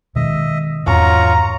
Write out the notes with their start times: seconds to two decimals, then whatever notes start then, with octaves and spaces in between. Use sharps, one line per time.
0.16 B2 D#3 G#3 D#5 E5
0.87 E2 G#2 F#3 C#4 F4 A#5 C#6